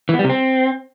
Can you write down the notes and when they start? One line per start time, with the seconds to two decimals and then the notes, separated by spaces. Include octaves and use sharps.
0.09 E3
0.14 B3
0.19 G3
0.24 C3
0.29 C4